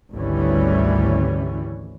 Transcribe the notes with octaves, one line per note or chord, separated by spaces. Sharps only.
G#1 D2 D3 E3 G3 C#4